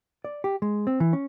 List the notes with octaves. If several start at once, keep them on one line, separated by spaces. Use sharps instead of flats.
D5
G4
G#3
C4
E3
C#4